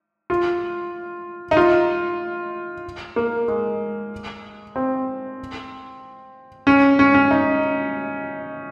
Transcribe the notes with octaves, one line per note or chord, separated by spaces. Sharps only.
F4
D#4
F4
A#3
G#3
C4
C#4
C#4
C#4
D#4